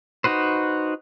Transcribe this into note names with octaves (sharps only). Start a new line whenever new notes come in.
D#4 F#4 B4 C5